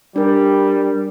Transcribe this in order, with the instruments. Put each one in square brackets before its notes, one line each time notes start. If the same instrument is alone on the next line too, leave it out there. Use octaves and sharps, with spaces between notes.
[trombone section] G3 [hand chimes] D4 A#4